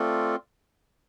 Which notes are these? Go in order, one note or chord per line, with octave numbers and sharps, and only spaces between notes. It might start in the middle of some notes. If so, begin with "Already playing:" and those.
Already playing: A3 C4 F4 A4 D5